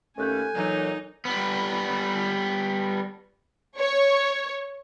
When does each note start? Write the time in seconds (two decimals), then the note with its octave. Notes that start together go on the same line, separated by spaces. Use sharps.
0.18 D#2 A3 C#4 A4 G#5 F#6 G6
0.55 A#2 E3 F#3 D#4
1.25 G3 B3
3.78 C#5